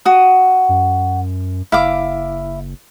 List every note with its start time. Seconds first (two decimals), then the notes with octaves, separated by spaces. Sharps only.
0.05 F#4 D#6
0.69 F#2
1.72 F#1 E4 F5 D6